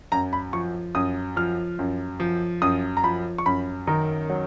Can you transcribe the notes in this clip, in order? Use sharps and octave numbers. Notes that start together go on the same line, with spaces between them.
F#2 A#5
B5
F3 C#6
F#2 D#6
F3 F6
F#2
F3
F#2 D#6
A#5
F3 B5
C#6
F#2 B5
D#3 A#5
F#3